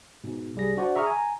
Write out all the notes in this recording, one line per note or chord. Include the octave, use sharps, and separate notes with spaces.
G#2 B2
C2 G3 G#4 A#6
D4 F#4 C5 D5 F#5
G#4 E5 A#5 C#6 D#6 F6
G#5 A#5